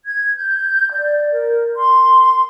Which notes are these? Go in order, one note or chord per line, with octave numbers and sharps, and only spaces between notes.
G#6
G6
D5
A#4
C6